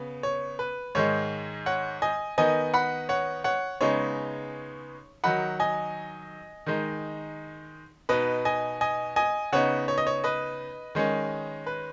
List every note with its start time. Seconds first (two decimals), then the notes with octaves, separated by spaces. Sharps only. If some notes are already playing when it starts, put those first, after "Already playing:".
Already playing: C#3 B3
0.23 C#5
0.59 B4
0.95 G#2 D#3 G#3 C#5
1.66 C#5 F#5
2.02 D#5 G#5
2.38 D#3 B3 D#4 D#5 G#5
2.74 F#5 B5
3.09 C#5 F#5
3.44 C#5 F#5
3.81 C#3 G#3 B3 D#4 C#5
5.24 D#3 F#3 D#4 F#5 B5
5.60 D#5 G#5
6.66 D#3 G#3 D#4
8.09 B2 B3 D#4 B4 D#5
8.45 D#5 G#5
8.81 D#5 G#5
9.16 D#5 G#5
9.52 C#3 B3 D#4 C#5 F#5
9.88 C#5
9.98 D#5
10.07 C#5
10.24 B4 D#5
10.95 D#3 G#3 C#4
11.66 B4